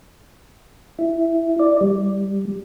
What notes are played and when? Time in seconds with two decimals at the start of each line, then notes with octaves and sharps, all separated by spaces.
0.99 E4
1.60 D5
1.81 G3